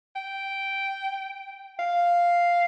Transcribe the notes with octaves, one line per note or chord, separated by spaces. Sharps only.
G5
F5